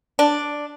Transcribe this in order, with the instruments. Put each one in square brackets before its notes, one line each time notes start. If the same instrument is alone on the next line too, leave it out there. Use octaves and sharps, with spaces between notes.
[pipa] D4